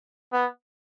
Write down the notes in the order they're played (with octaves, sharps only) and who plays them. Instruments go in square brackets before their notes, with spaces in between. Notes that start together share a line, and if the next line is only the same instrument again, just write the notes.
[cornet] B3